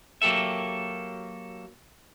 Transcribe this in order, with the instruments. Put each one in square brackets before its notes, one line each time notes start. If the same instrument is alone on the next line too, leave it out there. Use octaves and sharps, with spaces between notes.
[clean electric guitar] F#3 A#3 G4 A4 E5